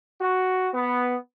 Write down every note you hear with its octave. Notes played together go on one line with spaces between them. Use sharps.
F#4
B3